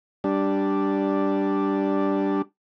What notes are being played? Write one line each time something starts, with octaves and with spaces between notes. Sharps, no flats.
G3 D4